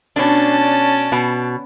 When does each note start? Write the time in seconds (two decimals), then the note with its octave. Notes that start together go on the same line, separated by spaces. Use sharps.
0.16 B2 C#4 D4 A5
1.12 B2